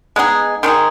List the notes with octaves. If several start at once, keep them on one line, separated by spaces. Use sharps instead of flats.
G#3 B3 D#4 G#4
D#3 G#3 D#4 G#4